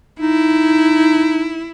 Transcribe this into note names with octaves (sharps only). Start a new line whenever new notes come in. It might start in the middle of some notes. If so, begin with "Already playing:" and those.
D#4 E4